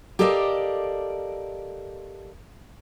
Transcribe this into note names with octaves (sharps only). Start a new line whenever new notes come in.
G4 A4 A#4 D5 D#5 F5